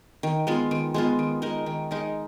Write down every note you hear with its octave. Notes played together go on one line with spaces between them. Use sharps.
D#3
G#3 B3 F4
D#3
G#3 B3 F4
D#3
G#3 D#4 A#4
D#3
G#3 D#4 A#4